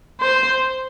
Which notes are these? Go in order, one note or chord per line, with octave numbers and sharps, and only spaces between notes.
C5